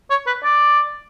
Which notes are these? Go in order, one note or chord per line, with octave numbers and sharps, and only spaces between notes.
C#5
B4
D5